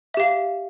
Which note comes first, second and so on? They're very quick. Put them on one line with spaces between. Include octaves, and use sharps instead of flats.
E5 G4 F5